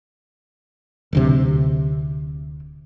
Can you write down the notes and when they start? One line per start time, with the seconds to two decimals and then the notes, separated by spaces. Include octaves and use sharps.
1.13 D1 D2 C3